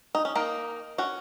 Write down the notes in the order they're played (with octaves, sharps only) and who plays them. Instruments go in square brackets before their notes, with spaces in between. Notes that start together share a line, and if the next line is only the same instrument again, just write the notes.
[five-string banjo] D#4
C#4
A#3 D#4
C#4 F#4